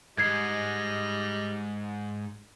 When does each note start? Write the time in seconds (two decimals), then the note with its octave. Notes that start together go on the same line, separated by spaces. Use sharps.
0.18 G#2 G3 D#5 G#6 C7